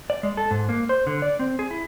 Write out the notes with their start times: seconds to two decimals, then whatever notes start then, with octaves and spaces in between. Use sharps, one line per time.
0.10 D5
0.23 G#3
0.37 A4
0.51 G#2
0.69 A#3
0.89 C5
1.07 D3
1.22 D5
1.39 C4
1.59 G#4
1.71 E4